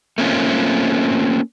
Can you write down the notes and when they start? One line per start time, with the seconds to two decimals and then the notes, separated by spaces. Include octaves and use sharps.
0.18 A3 A#3 C4 C#4 F4